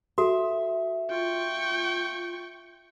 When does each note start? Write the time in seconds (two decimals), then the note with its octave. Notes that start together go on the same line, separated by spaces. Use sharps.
0.18 F#4 A4 E5
1.11 F4 G5 C#6